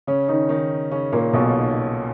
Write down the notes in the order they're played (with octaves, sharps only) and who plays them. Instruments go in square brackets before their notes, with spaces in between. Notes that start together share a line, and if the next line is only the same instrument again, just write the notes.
[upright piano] C#3 C#4
D#3 D#4
D#3 D#4
C#3 C#4
A#2 A#3
B1 B2